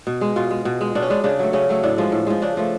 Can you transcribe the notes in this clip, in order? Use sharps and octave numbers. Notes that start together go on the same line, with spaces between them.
B2
G#3
B2 F4
G#3
B2
G#3
B2 D4
C#4
G#3 D4
C#3 D4
F#3 A3
C#3 C#4
F#3 A3
A2 D4
F3 G#3
A2
F3 G#3
C#3 D4
F3 A3